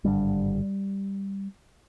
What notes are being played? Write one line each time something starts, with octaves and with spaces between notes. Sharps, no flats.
G#1 G2 D3 G3